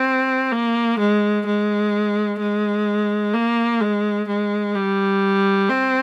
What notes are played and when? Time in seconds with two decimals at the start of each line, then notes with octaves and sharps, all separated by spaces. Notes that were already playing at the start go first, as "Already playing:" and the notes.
Already playing: C4
0.51 A#3
0.99 G#3
1.46 G#3
2.39 G#3
3.34 A#3
3.81 G#3
4.28 G#3
4.75 G3
5.69 C4